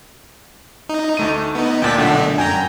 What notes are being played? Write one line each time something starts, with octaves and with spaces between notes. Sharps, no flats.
D#4
D2 A3 D#7
B3 D#4
D2 A#2 D5 G5 A5 B6
B1 D3 A3 D4 F#5
F#2 G5 G#5 A#5